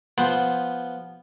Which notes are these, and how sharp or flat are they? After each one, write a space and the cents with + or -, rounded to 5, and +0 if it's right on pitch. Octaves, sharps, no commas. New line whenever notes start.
F3 +0 B3 +0 C5 +0